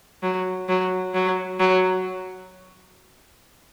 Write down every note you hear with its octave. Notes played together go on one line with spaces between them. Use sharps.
F#3
F#3
F#3
F#3